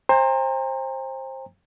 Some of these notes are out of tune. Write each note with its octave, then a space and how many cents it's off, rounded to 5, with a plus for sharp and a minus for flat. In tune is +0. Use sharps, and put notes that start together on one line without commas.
C5 +20 G5 +45 A#5 -30